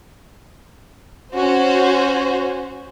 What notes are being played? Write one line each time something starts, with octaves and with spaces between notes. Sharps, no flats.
C#4 F#4 C5